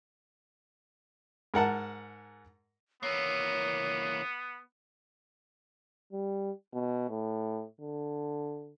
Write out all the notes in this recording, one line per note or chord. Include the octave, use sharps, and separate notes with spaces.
G#2 A#4 F#5 A5
E3 A#3 B3 C#5
G3
B2
A2
D3